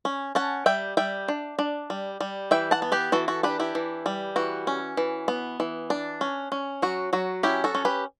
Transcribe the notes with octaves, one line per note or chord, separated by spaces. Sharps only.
C#4
C#4 F#5 A5
G3 E5 G5
G3 E5 G5
D4
D4
G3
G3
E3 E5 G5
F#5 A5
B3
G4 B4
E3 F#4 A4
F#4 A4
D4 G4 B4
E4 G4
E3
G3
E3 F#4
C#4
E3
B3
E3
D4
C#4
C#4
F#3 F#4
F#3 F#4
C#4 E4 G4
F#4 A4
C#4
G4 B4